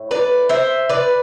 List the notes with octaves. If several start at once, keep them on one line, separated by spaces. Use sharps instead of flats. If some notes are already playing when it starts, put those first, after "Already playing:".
Already playing: A2
B4 D5
C5 E5
B4 D5